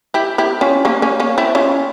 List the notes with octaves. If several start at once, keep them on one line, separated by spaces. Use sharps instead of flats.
E4 G4
E4 G4
C#4 F4
A#3 C#4
A#3 C#4
A#3 C#4
C4 E4
C#4 F4